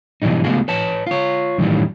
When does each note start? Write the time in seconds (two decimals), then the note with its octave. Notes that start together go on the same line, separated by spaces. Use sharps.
0.22 B2 E3 F#3 G3 D#4
0.44 C#2 A3 B3 F4 F#4 G#4
0.68 B4 C#5 A5
1.07 F4 C#5
1.58 F#2 A2 D#3 E3 F#3 G3